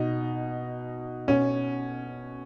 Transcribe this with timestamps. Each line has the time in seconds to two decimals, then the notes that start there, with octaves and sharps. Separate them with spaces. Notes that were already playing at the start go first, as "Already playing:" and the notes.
Already playing: B2 D#4
1.28 B2 C#4